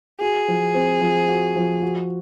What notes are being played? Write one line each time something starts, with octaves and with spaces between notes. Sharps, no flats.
F#4 G#4
F3
C4
F3
F#4
F3
F#4